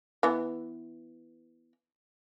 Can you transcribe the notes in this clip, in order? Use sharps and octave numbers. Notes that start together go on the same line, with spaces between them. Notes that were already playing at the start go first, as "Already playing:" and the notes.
E3 B3